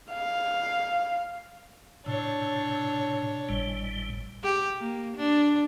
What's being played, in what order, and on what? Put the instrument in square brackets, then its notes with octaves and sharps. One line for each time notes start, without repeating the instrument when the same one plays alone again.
[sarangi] F5
[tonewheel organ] A2 C3 [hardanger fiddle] D4 C#5
[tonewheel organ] G#1 A2 G3
[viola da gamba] G4
A#3
D4